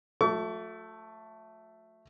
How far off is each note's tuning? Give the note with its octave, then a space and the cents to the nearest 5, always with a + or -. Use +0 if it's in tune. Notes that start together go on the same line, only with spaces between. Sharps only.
F#3 -45 A3 +0 C#6 +45